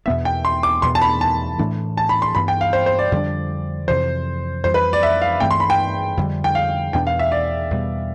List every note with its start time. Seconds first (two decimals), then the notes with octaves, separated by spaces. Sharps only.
0.06 E2 B2 B3 D4 E5
0.25 G5
0.45 C6
0.63 D6
0.82 E2 B2 B3 C6
0.95 A5
1.02 B5
1.21 A5
1.59 A2 E3 A3 D4
1.97 A5
2.09 B5
2.22 C6
2.35 G2 E3 B3 B5
2.48 G5
2.61 F5
2.73 C5
2.86 C5
2.99 D5
3.12 F2 D3 G3 D4
3.88 F2 C3 E3 C5
4.64 F2 E3 G3 C5
4.74 B4
4.93 D5
5.03 E5
5.22 F5
5.40 G2 E3 A3 C4 G5
5.51 C6
5.60 B5
5.70 G5
6.17 F2 D3 G3
6.44 G5
6.55 F5
6.93 E2 B2 B3 D4 G5
7.07 F5
7.19 E5
7.32 D5
7.71 E2 B2 G3 B3